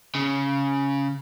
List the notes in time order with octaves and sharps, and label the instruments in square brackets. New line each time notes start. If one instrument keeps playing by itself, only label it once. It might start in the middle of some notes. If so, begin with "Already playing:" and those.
[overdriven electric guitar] C#3